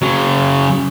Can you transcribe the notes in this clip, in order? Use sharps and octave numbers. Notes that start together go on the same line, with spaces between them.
C#3 F#3